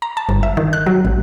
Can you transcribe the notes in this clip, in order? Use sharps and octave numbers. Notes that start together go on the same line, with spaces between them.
A#5
A5
G1
E5
D#3
F#6
F#3
A1